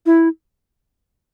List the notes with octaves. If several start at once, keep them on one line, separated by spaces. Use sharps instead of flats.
E4